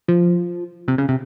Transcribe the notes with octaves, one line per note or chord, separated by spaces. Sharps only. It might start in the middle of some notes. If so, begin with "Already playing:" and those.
F3
C3
C#3
C3